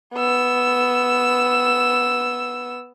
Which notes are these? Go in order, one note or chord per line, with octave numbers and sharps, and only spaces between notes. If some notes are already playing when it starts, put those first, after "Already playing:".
B3 E6